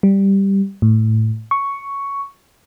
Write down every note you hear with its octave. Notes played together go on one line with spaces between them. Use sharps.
G3
A2
C#6